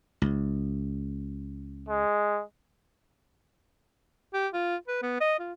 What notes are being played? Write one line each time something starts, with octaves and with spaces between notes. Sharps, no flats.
C#2
G#3
G4
F4
B4
B3
D#5
F4